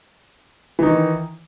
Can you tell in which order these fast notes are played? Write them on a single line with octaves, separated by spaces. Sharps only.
E3 D#4 D#3